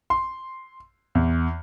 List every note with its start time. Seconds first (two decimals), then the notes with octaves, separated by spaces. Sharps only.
0.10 C6
1.15 E2